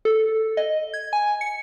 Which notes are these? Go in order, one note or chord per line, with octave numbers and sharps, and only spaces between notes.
A4
D#5
G#6
G#5
C#7